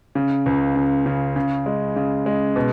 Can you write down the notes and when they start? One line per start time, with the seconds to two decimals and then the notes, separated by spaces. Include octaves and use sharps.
0.15 C#3
0.46 C#2
0.76 C#3
1.06 C#3
1.36 C#3
1.66 G#3
1.96 C#3
2.26 G#3
2.56 B2